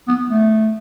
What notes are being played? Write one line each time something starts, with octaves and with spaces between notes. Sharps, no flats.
B3
A3